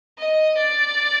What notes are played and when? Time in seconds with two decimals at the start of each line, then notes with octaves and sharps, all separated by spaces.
0.19 D#5
0.57 D5